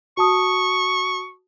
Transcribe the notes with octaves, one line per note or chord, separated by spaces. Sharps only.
F#4 A5 C#6 D#6